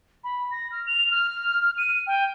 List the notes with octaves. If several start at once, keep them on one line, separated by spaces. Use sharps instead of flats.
B5
A#6
F6
F7
F6
D#7
G5